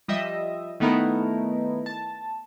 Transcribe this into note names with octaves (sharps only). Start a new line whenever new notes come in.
F3 G3 D#5 E5
D#3 A3 B3 D#4 E4 A#4
A5